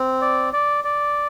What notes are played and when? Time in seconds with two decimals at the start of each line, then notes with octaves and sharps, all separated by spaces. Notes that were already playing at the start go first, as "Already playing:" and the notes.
Already playing: C4
0.22 D5
0.53 D5
0.84 D5